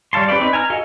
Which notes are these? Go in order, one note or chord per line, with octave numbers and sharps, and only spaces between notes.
G3 C#5 F5 A5 C6
C#4 G4 B4 D5
C4 D#4 B4
G#5 A#5 F6
F#4 A4 D#5 F5 G#5